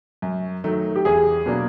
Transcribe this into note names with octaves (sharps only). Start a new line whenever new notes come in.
F#2
D#3 F#3 A3
G4
E2 G#4
B2 F#3 A#3 D4